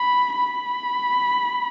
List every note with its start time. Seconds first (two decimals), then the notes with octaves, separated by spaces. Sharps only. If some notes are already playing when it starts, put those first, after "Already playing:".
Already playing: B5
0.38 B5